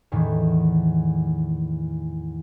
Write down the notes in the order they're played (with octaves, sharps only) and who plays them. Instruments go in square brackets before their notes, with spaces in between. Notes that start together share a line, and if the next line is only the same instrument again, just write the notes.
[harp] E2 A2 D#3 E3